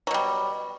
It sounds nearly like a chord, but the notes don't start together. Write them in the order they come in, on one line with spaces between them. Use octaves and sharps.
F#3 B2 G3